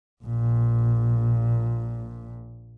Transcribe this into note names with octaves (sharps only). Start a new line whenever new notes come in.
A#1 A#2